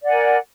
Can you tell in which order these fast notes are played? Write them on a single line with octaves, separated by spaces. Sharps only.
D5 F#5 G#5 A#4